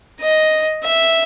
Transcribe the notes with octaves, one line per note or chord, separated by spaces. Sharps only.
D#5
E5